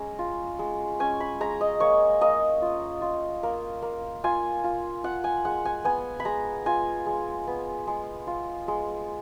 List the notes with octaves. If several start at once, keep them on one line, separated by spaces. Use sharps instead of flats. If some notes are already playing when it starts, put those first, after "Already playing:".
Already playing: G#3 C#4 A#5
F4
G#3
C#4 G#5
B5
G#3 A#5
D#5
A#3 C#5
A#3 D#5
F4
F4
A#3
A#3
F4 G#5
F4
F4 F#5
G#5
G#3 F#5
G#5
B3 G#5
B5
G#3 A#5
F4 G#5
G#3
B3
G#3
F4
G#3